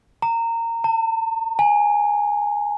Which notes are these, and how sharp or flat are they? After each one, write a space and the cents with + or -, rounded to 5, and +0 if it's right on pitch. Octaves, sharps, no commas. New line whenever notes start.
A#5 -20
A5 +40
G#5 -5